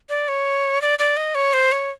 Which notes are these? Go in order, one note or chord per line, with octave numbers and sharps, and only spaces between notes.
D5
C#5
D5
D5
D#5
C#5
C5
C#5